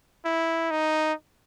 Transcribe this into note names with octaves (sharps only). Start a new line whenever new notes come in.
E4
D#4